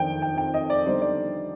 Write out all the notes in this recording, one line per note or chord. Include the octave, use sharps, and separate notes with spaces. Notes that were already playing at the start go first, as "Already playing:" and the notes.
Already playing: F2 D#3 D4 G5
G5
G5
D#5
D5
D3 G3 B3 D#4 C5
D5